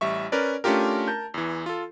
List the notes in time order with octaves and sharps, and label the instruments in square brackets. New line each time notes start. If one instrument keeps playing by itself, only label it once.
[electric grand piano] A1 G3 E5 C#6
C#4 A#4 B4 D5
A3 C#4 D4 F4 G4 A#4
A#4 A5 G6
E2 E3
F4 A4